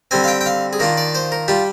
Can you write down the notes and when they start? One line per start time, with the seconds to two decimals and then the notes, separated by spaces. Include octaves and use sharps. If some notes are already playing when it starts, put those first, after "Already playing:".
0.11 D3 G3 C4 G#5
0.24 F5
0.28 G5
0.41 G5
0.46 F5
0.73 G#4
0.79 D#3 A#3 D4 F4 A#4
0.97 D5
1.15 C5
1.32 A#4
1.48 G3 D4 F4 G4